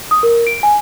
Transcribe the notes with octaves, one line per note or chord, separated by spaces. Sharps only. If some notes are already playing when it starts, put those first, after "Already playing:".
D#6
A#4
D7
G#5